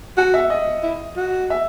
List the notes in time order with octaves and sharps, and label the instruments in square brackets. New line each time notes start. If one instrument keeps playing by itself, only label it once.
[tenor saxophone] F#4 [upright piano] F#5
[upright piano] E5
D#5
[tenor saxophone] E4
F#4
[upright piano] E5